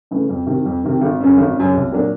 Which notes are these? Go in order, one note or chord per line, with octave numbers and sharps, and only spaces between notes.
C#3 E3 A3
F2
C3 D#3
F2
C3 D#3
G#1
F#2 C#3
G#1
F#2 C#3
C2
A#2 F#3 A#3 D4